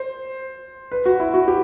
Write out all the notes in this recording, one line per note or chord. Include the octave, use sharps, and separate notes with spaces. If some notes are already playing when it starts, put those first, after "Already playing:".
Already playing: C5
B4
F#4
E4
F#4
G4